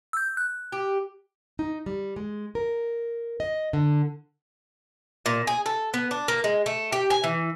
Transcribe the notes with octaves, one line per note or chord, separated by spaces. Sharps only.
E6 G6
F#6
G4
D#4
G3
G#3
A#4
D#5
D3
A#2
G#4
A4
B3
D4
A#3
G#3
A3
G4
G#5
E3